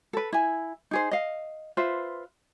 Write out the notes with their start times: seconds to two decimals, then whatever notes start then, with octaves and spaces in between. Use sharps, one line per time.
0.13 A4 B4
0.33 E4 G#5
0.91 D#4 G#4 C5
1.11 D#5 F5
1.77 F4 B4 C5 E5